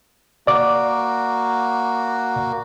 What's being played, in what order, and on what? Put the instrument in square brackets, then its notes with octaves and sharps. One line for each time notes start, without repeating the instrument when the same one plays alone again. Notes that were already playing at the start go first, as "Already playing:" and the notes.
[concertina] A#3 F#4 [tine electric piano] D5 D6